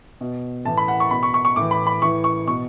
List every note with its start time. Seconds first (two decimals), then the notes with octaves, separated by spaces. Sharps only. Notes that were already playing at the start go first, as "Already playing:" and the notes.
0.21 B2
0.65 A2 E3 A5
0.78 B5
0.88 F#5
1.00 C#6
1.11 B2 B5
1.23 C#6
1.34 C#6
1.45 C#6
1.56 A2 E3 D6
1.71 B5
1.87 B5
2.02 A2 E3 C#6
2.24 C#6
2.47 B2 C#6